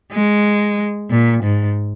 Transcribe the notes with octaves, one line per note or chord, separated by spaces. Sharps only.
G#3
A#2
G#2